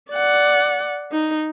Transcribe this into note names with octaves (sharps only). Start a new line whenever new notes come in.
D5 F#5
D#4